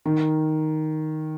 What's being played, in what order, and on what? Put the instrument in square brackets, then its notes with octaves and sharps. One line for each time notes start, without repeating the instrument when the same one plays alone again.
[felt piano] D#3